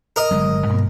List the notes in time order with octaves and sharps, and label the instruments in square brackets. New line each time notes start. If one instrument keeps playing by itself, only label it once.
[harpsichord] A#4 D#5
[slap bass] G1 F#3 G#3
G2 B2 A#3